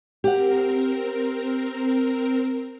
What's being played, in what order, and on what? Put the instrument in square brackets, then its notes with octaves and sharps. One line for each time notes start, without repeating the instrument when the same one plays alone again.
[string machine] C4 A#4 [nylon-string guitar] G4 F#5